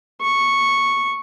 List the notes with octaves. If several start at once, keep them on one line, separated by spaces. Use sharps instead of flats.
C#6